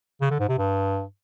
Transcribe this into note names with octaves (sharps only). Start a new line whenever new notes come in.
C#3
D3
G#2
C3
G2